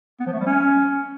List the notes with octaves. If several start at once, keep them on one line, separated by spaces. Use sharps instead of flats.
B3
F3
A3
G3
C#4